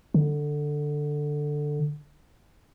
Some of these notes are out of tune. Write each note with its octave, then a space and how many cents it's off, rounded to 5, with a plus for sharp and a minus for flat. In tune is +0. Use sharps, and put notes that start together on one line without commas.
D3 +10